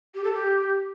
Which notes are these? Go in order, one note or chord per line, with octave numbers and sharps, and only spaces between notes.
G4
A4
G4